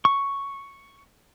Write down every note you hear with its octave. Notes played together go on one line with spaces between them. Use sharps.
C#6